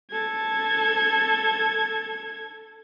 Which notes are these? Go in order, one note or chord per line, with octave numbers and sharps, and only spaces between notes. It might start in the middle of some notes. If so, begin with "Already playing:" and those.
A4 G#6